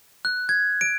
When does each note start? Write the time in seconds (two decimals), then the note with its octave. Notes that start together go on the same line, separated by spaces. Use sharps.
0.25 F#6
0.49 G#6
0.81 D7